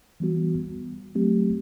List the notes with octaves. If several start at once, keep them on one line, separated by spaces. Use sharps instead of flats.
E3 G3 B3 F#4
F#3 A3 C4 G4